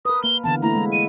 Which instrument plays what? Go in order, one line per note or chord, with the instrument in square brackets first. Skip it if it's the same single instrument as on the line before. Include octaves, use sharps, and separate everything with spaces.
[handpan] A#4 B4 [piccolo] D#6
[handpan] A#3 [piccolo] G7
[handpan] D3 E3 B3 [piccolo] A5
[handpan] A3 A#3 E4 [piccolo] A#5
[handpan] G#3
[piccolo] D#7